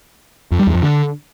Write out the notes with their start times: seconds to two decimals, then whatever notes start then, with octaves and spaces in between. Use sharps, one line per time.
0.52 F2
0.59 G3
0.67 E2
0.75 F2
0.82 D3